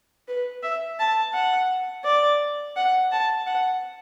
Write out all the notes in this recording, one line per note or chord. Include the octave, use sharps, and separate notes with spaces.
B4
E5
A5
F#5
D5
F#5
A5
F#5